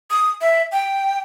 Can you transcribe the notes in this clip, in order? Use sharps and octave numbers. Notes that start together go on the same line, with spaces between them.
D#6
E5
G5